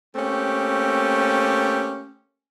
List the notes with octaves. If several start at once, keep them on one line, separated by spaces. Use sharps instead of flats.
A3 A#3 C4 C#4 G4